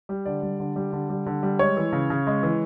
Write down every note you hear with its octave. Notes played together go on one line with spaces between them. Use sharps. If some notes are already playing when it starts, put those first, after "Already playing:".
G3
D3 D5
G3
D3
G3
D3
G3
D3
G3
G#3 C#5
E3
C#3
C#3
G#3
E3